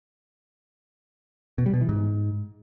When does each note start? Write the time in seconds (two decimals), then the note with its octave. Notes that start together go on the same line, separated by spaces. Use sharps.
1.58 B2
1.66 G3
1.74 B2
1.81 E3
1.89 G#2